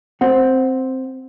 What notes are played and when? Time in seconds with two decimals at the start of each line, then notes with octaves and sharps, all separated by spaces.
0.21 C4 F#5